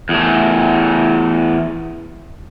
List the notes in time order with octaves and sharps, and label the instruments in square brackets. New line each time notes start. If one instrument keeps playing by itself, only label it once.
[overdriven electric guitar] E2 A3